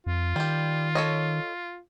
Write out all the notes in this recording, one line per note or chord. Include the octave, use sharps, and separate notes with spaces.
F2 F4
D#3 G3 G4
A4 C#5 D#5